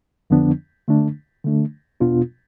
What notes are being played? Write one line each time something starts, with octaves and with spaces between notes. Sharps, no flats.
F2 D3 F3 B3 D4
D3 A3 D4
D3 A3 D4
E2 B2 B3 D4 F4